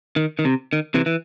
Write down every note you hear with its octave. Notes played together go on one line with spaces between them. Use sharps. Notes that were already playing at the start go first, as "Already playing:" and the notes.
D#3
D#3
C3
D#3
C3 E3
E3